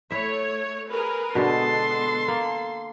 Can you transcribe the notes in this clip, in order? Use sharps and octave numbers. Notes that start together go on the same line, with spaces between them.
A3 E4 C#5 E5
G#4 A#4 B4
B2 D3 G#3 B3 A4 A5 C6
A#3